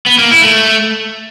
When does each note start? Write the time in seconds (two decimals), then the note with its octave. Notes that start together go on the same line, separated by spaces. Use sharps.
0.06 B3
0.18 A#3
0.30 E4
0.42 A3